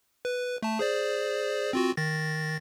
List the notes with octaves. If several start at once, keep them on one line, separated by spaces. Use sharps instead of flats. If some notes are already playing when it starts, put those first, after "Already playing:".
B4
A3 A5
G#4 C5 D5
C4 F4 F#4
D#3 A6 A#6